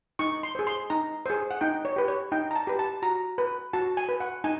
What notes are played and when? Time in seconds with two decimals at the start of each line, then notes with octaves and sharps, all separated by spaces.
0.19 D#4 C#6
0.43 C6
0.55 G#4 C5
0.67 C6
0.90 D#4 A#5
1.26 G#4 C5
1.51 F#5
1.61 D#4 G5
1.85 C#5
1.96 G4 B4
2.08 C#5
2.32 D#4 G5
2.51 A#5
2.56 A5
2.67 G4 B4
2.79 A5
3.02 F#4 A#5
3.38 B4
3.73 F#4 A5
3.97 G#5
4.09 B4
4.20 F#5
4.44 D#4 G#5